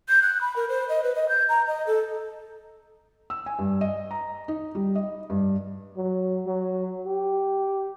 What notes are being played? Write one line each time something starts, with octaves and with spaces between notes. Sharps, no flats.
G6
F#6
B5
A#4
C5
D#5
B4
D#5
G6
A#5
D#5
A4
E6
G#5
G2
D#5
A#5
D#4
G3
D#5
G2
F#3
F#3
G4